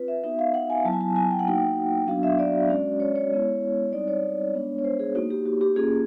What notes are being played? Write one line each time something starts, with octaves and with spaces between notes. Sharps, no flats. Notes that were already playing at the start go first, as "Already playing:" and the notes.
Already playing: C4 F4 B4
E5
B3 D#4 F#4 E5
F5
F#5
G#5
F#3 B3 E4 A5
G#5
A5
G#5
G5
F#5
A#3 D#4 F#4 G5
F#3 B3 D4 F#4 F5
E5
D5
G#3 C#4 F#4
C#5
C#5
G#3 B3 E4
G3 C4 D#4 D5
C#5
G#3 B3 D4
C#5
C5
G#4
A#3 D#4 F#4
G4
F#4
G4
A#3 C#4 F4 G#4